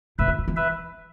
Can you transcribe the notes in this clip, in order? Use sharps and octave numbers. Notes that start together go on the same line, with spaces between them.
A2 B4 E5
D3
D3
E3
B4 E5